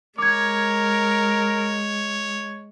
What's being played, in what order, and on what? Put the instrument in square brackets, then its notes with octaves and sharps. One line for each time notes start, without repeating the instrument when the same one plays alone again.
[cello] G#3 [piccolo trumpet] A#4 [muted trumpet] C#5 [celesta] D6 G#6